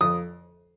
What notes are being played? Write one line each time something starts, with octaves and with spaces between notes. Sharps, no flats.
F2 D#6